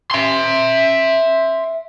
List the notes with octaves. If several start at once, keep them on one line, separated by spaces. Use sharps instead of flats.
E5 C6